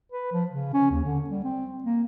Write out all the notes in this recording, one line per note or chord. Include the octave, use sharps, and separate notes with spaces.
B4
F3
C#3
C#4
D#2
D3
G3
C4
A#3